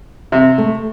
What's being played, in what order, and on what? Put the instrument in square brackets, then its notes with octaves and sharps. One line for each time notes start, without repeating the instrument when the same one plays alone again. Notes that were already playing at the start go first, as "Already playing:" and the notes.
[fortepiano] C3
[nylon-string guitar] A3